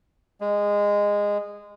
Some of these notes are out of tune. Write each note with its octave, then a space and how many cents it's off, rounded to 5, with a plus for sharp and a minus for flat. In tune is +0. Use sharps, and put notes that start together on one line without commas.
G#3 -15